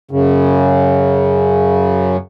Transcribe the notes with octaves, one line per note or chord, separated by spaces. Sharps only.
F#2 C#3